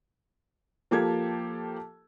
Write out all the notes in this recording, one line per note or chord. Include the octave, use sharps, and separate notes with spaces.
F3 A#3 G4 A4 G#6